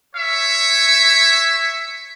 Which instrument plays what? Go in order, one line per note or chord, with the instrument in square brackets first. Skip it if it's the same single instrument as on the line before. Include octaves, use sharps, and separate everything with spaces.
[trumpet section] C#5 E5